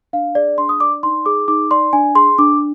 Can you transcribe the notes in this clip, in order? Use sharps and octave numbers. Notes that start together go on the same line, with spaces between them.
D4 F5
G#4 D5
D4 C6
D#6
D5 D6
D#4 C6
G#4 D6
D#4 D6
D5 C6
D4 G#5
G#4 C6
D4 D6